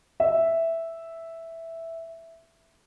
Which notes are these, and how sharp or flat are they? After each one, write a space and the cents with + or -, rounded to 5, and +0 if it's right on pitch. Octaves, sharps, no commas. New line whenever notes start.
E5 +0